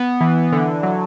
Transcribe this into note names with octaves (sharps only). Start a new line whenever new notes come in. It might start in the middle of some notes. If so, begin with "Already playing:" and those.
Already playing: B3
E3
D3
F#3